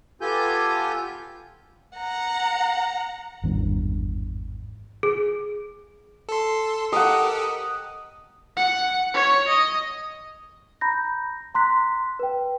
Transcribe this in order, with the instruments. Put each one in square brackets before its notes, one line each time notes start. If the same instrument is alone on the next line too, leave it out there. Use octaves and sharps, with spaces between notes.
[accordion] B3 F4 G4 A4 G#5 G6
[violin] F#5 A#5
[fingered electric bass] G#1 E2 G2
[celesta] G#4
[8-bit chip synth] A4 C6
[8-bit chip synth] G4 A4 A#4 [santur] D#5 F#5
[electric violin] F#5
C#5
D#5
[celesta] A#5 B5 G6 A#6
A#5 C6 F#6 B6
B4 G5